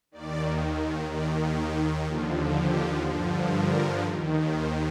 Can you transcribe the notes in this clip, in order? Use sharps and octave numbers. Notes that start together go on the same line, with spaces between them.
D#2 D#3 D5
D#2 D#3 D5
G4
D#2 D3 F3 F4
G4
G2 D3 F3
A#4
D#2 D#3
C5